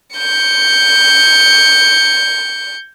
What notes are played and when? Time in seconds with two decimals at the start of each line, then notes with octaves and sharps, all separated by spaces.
0.16 G6 C#7